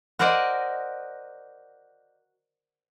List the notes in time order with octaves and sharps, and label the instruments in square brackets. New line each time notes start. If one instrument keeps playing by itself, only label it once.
[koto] F#4 A#4 C5 D5 D#5